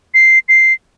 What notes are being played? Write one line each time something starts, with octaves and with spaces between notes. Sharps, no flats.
C7
C7